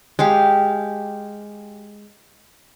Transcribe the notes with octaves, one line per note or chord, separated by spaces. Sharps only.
G#3 G4 F5